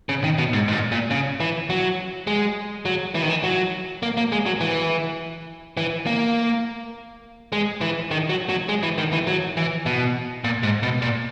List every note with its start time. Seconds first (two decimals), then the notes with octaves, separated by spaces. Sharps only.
0.09 C#3
0.24 D#3
0.38 B2
0.53 G#2
0.68 G#2
0.72 A#2
0.92 A#2
1.11 C#3
1.40 E3
1.70 F#3
2.27 G#3
2.85 F#3
3.15 E3
3.23 D#3
3.30 E3
3.43 F#3
4.03 A#3
4.17 A#3
4.32 G#3
4.46 F#3
4.61 E3
5.77 E3
6.06 A#3
7.52 G#3
7.81 E3
8.11 D#3
8.30 F#3
8.49 F#3
8.69 G#3
8.83 E3
8.98 D#3
9.13 E3
9.27 F#3
9.57 E3
9.86 B2
10.44 A#2
10.63 G#2
10.83 B2
11.02 A#2